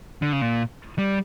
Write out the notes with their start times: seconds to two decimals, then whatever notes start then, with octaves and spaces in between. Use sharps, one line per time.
0.22 D3
0.33 C#3
0.42 A#2
0.98 G3